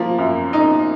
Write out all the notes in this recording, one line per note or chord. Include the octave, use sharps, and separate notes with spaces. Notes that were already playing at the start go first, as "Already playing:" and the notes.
Already playing: F3 A#3
F#2
D#4